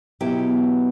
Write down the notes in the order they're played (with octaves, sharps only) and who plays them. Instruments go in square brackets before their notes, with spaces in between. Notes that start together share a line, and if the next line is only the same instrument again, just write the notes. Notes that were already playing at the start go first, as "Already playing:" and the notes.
[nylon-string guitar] B2 F#3 B3 E4 G4